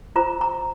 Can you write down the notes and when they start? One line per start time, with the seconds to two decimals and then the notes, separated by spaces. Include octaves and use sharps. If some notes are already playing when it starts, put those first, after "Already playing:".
0.16 F4 C5 A#5
0.41 A#5